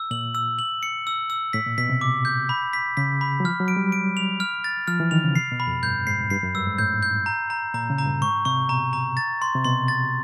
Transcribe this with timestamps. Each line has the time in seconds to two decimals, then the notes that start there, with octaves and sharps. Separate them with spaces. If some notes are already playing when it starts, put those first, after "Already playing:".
Already playing: E6
0.11 A#2 F#7
0.35 E6
0.59 F#7
0.83 C#7
1.07 E6
1.30 E6
1.53 A2 B6
1.66 A#2
1.78 B2 B6
1.90 C3
2.01 D6
2.25 G6
2.49 B5
2.73 B6
2.97 C#3 B6
3.21 B5
3.40 F#3
3.44 F3 F6
3.60 F#3
3.68 D7
3.77 G3
3.92 D7
4.17 F7
4.40 F6
4.64 A6
4.88 F3 F6
5.00 E3
5.11 D#3 F7
5.24 C#3
5.35 C3 C7
5.52 B2
5.60 B5
5.67 F2
5.83 G2 G6
6.07 G#2 C7
6.30 G2 C7
6.43 F#2
6.54 G2 E6
6.67 G#2
6.78 A2 G6
7.03 G6
7.26 A#5
7.50 A#5
7.74 A#2 A#5
7.90 C#3
7.98 A#5
8.06 G2
8.22 G#2 C#6
8.45 C3 C#6
8.69 B2 A#5
8.93 A#5
9.17 A6
9.42 C6
9.55 C3
9.65 B2 C6
9.88 A6